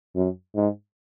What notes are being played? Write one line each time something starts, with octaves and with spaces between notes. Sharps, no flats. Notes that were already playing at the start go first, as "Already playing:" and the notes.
F#2
G#2